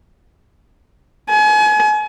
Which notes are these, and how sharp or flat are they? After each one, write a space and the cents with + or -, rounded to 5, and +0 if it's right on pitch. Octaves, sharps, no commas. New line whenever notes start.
G#5 +35